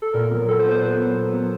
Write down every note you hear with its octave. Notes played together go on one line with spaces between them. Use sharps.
A4
A#2 A#4
F#3 B3
A#2 A4
C5
F#3 B3
C5
A#2 B4
F#3 B3
A#2
F#3 B3